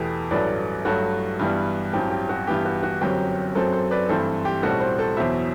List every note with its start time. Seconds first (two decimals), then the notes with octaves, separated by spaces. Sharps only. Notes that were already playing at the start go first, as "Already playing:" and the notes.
Already playing: E2 B2 A3 G4 B4
0.31 A1 G2 F#3 A3 B4 D5
0.85 G2 F#3 A3 F#4
1.39 G2 E3 G3 B3
1.93 A1 G2 F#3 C4 G4
2.11 G4
2.29 F#4
2.47 G2 E3 B3 G4
2.65 F#4
2.83 F#4
3.01 G1 F#2 F#3 C4 G4
3.55 F#2 F#3 C4 A4 C5
3.72 A4 C5
3.91 B4 D5
4.09 G2 E3 A3 C4 A4 C5
4.45 G4
4.62 B1 A2 G3 C4 F#4 A4
4.81 A4 C5
4.98 A4 C5
5.17 E2 B2 F#3 C5 E5